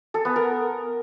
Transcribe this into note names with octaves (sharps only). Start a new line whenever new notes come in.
A4
B3
A#4